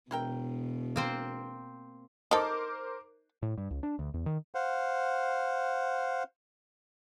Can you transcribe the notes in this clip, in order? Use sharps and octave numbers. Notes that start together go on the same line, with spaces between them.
E1 B2 E4 A#4 G5
A#3 C4 C5
D#4 A4 A#4 C5 D6
A2
G2
C#2
D4
D2
E2
D#3
C5 F5 F#5